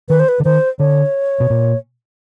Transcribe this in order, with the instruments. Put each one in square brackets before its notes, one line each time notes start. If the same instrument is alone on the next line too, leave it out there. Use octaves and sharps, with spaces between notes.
[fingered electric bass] D#3 [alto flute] B4
[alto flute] C5
B4
[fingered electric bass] D3
[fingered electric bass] D#3 [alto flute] C5
[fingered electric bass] D3 [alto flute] C#5
[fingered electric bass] B2
A#2